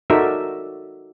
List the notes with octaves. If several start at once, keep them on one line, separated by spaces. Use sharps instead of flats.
D#4 F#4 A4 A#4 D5 E5